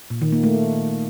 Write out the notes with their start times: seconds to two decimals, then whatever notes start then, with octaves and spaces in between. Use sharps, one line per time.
0.10 A#2
0.21 D#3
0.32 A#3
0.43 A3